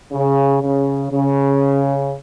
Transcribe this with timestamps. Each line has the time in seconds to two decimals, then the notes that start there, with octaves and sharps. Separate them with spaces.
0.13 C#3
0.62 C#3
1.11 C#3